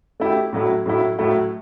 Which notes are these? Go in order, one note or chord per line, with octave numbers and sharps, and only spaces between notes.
A3 E4 G4
A2 F#3 A3 E4
A2 F#3 A3 E4
A2 F#3 A3 E4